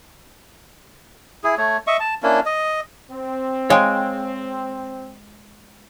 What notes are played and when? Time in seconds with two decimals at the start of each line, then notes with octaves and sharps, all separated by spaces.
1.44 E4 G#4
1.58 A3 C#5
1.87 D#5 E5 C#6
2.00 A5
2.23 A#3 C#4 D4 E4
2.45 D#5
3.11 C4
3.70 G#3 C#5 F5 G5